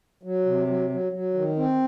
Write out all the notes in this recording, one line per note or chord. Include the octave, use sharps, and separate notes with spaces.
F#3
C3
F#3
F#3
F#3
D#3
C4